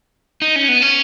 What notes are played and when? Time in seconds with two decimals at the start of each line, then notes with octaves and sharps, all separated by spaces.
0.42 D#4
0.56 C#4
0.69 B3
0.82 C#4